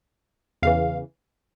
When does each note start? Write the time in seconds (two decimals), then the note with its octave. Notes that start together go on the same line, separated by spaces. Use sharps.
0.63 E2 C#3 E3 F5